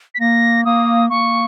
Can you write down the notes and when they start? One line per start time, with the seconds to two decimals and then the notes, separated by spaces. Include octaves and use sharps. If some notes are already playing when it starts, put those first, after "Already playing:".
0.15 B6
0.20 A#3 A#6
0.65 A#3 D#6
1.10 A#3 C#6